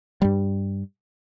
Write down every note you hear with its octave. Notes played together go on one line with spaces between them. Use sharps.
G2 G3